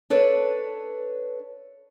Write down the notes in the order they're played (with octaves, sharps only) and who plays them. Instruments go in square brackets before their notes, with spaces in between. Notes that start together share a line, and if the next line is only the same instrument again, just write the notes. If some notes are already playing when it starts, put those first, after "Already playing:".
[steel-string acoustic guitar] D4 A4 B4 C#5